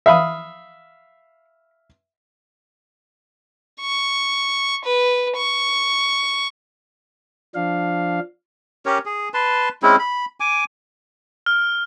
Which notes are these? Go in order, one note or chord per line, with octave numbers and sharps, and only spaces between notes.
E5 F5 B5 D#6
C#6
B4
C#6
F3 D4 F5
C#4 G4 A#4 C#5
G#4
B4 A5 C6
G#3 C4 C#4 E4
B5
G#5 D6
F6